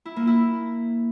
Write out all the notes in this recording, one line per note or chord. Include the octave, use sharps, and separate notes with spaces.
E4
A#3
E4